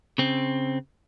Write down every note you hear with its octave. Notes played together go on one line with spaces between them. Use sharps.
C#3 C4